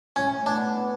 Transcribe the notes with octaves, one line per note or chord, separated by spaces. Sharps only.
A2 C#4
B3 D4
B3